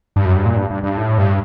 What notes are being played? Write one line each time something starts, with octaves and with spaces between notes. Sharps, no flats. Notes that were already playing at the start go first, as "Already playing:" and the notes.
G2
F#2
G2
A#2
G2
G2
G2
A2
G2